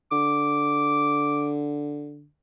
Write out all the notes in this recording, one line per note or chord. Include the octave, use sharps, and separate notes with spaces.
D3 D6